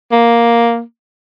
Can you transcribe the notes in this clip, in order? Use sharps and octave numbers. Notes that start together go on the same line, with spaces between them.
A#3